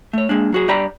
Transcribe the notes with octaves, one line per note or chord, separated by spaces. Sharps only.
A3 C#5
G#3 A#3 D4
F#3 F#4 G#4
G2 G4 D5 G5 A#5 B5